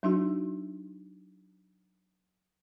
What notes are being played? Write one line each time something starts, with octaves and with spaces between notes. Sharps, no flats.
F#3 D4 D#4 F#4